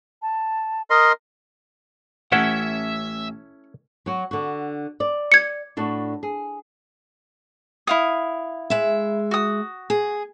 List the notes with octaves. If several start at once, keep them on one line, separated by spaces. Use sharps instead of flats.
A5
A#4 D#5 C6 D#6
A1 C#4 E4 A4 E5 F#5
F#3 F#4
D3 F#4
D5
G#6 C#7
A2 D4 F#4
G#4
E4 F5 D#6
G#3 E5
F#4 D#6
G#4